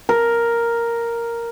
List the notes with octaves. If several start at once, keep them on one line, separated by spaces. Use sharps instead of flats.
A#4